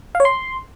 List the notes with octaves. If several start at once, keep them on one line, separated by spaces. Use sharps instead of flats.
F5
C#5
C6